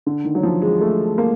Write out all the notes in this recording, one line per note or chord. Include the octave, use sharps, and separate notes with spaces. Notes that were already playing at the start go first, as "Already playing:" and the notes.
D3
D#3
F#3
F3
G#3
A3
A#3